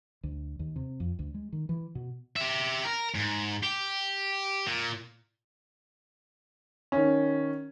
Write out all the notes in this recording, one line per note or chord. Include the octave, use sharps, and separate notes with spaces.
D2
D#2
C3
F2
D2
G#3
D#3
E3
B2
G4 E5
A#4
G#2
G4
A#2
D#3 C#4